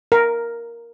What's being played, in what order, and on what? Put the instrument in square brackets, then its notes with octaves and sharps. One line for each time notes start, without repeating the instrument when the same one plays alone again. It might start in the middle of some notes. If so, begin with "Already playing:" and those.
[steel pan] A#4